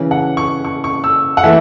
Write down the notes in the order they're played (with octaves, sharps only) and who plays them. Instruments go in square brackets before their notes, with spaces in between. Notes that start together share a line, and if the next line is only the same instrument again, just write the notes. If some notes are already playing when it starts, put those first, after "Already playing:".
Already playing: [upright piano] C#3 E3 C#4
F#5
C#6
C#6
C#6
E6
F#5
E3 A3 E5